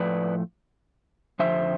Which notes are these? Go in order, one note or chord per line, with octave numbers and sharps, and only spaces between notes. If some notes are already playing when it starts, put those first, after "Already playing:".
Already playing: A2 F3 A3 B4 D5
F2 D3 F3 C5 E5